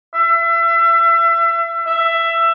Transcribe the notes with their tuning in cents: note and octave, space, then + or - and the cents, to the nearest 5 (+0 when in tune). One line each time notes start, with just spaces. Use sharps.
E5 +30
E5 +15